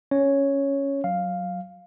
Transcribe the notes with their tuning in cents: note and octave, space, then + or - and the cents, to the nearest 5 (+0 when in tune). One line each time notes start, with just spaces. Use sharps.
C#4 +0 C#5 +0
F#3 +0 F5 +0